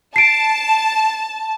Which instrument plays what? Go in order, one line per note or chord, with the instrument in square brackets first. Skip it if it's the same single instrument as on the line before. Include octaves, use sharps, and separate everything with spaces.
[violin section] A5 [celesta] C7 D7